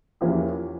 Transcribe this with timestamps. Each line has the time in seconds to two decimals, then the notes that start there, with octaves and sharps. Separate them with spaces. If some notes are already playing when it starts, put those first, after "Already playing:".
0.21 E2 E3 F3 A#3 C#4 G4